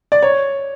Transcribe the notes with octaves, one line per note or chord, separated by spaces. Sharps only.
D5
C#5